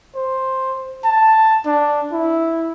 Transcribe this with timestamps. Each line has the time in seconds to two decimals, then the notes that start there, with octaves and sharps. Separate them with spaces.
0.16 C5
1.04 A5
1.66 D4
2.12 E4